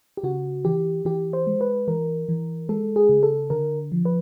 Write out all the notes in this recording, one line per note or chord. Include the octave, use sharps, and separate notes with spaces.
G4
C#3 F#4
E3 G4
E3 G4
C5
G#3
B4
E3 A#4
E3
G#3 A4
G#4
C#3
A4
D3 A#4
F3
B4